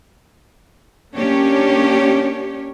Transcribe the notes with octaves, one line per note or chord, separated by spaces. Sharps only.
A#3 C#4 D4 G4 C#5